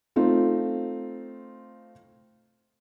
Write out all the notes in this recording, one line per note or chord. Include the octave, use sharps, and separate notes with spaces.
A3 C4 D#4 F4